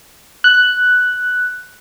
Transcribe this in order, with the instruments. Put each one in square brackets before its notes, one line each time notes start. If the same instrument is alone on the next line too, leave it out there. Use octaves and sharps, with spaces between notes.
[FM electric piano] F#6